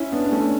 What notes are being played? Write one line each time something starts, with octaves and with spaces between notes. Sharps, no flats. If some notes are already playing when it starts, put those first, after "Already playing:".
Already playing: C#4 E4
B3 D4
D4
A3 C#4